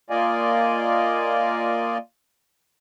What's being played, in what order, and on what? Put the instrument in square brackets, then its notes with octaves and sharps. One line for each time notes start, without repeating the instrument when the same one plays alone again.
[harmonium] A#3 F4 D5 D#5 F5 G#5